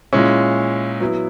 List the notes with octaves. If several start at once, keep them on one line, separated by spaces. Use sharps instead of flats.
A#2 G#3 C#4 E4
F#3 B3 E4